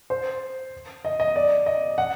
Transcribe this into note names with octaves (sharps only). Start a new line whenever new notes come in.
C5
D#5
D#5
D5
D#5
F#5